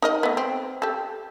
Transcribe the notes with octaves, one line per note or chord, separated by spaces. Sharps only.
D#4 A#4 D#5
A3 B3
C4
G4 A4